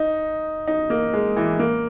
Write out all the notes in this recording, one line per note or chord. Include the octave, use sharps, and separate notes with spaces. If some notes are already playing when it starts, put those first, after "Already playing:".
Already playing: D#4
D#4
A#3
G#3
E3
A#3